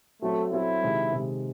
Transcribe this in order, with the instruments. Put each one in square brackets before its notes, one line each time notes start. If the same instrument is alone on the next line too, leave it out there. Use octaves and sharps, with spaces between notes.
[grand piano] F#3 C4 F#4 A4 [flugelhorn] A3
[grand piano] F#3 C4 F#4 A4 [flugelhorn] E4
[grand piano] C3 D#3 G#3
C3 D#3 G#3